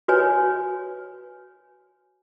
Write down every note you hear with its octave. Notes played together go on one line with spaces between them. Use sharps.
F#4 B4 C#5 G#5